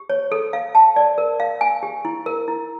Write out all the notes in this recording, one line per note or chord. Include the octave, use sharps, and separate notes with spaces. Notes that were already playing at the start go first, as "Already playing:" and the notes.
Already playing: G4
C#5
A4
F5
A5
D5
A#4
F5
G#5
G4
E4
A#4
E4